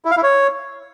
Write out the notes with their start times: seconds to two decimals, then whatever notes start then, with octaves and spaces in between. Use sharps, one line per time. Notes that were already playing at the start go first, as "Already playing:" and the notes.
0.05 E4
0.11 F5
0.17 E4
0.23 C#5